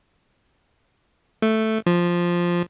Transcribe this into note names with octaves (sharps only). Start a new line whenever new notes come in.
A3
F3